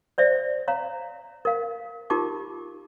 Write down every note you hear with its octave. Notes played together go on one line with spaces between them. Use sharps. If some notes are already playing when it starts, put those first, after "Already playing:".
C5 D5 E5
C#5 F5 A#5
A#4 F5
D#4 F4 G4 A#4 A5 D6